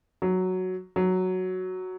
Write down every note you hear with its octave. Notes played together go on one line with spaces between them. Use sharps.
F#3
F#3